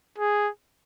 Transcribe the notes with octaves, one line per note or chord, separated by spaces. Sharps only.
G#4